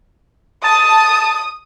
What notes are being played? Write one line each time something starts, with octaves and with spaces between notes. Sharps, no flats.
A5 D#6